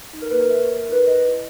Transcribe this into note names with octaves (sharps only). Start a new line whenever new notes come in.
D#4
A#4
A#3 B4
A#4
A#3 E5
C#5
G#4
A#4
D#4 B4
G#4 D#5
E4